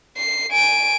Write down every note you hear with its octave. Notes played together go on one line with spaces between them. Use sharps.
C7
G#5 D7